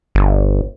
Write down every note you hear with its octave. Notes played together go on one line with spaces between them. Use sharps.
G1